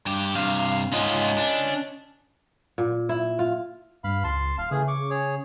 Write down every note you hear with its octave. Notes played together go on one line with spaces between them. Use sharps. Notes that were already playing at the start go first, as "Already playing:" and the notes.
G2 G4
G2 C3 F5
G#2 C#4 F4 D#5
D4
A#2
E4
F4
G2 F5 B5
C#2 A5 C6
D#1 F5
C#3 E3 A3 G#4
C#6 D6
G#4 C#5